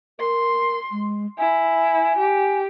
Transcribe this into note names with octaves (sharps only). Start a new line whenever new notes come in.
A#4 C6
G#3
E4 G#5
G4